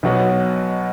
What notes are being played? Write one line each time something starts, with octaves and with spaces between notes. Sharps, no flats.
B1 B2 F#3 B3 F#4